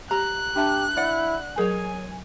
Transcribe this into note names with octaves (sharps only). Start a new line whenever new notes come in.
G4 A#5 F#6
D4 G4 E5 A5
E4 D5 F#5
F#3 G#4 A#4 C#5 G#5